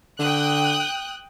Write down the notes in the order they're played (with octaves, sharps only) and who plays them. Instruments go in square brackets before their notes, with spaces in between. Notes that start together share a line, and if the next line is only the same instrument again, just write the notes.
[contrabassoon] D3 [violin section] G5 D#6 F#6